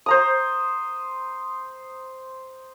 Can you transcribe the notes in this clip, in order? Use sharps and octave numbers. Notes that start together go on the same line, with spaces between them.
C5 A#5 D#6